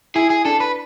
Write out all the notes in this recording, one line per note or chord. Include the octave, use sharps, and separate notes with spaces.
E4 G#4
G#4
D4 A4
B4